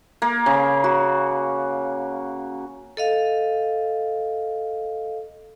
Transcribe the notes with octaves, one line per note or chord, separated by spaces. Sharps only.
A#3
C#3
F#4
A4 D#5 F5